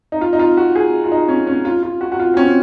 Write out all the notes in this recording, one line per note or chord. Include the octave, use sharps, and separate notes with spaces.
D#4
F4
D#4
F4
F#4
G#4
F4
D#4
C#4
C#4
F4
F4
F#4
F#4
F4
C4
C#4